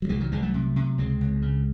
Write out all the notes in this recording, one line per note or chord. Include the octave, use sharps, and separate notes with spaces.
F#3
C2 E3 G#3
D#3 F#3
C2 E3 G#3
F#3 A3
C3
C3
C#2 G#3 C4
C#2
C#3